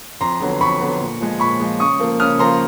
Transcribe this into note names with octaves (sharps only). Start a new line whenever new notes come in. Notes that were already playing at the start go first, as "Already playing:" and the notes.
F2 A#5 C6
D3 F#3 B3
F2 B5 C#6
D3 F#3 B3
A#2
F3 G#3
A#2 B5 C#6
F3 G#3
C#3 C#6 D#6
F3 A#3
C#3 D#6 F6
F3 A#3 A#5 C6